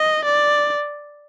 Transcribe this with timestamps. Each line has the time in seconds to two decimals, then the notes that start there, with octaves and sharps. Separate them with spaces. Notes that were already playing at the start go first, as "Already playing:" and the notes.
Already playing: D#5
0.25 D5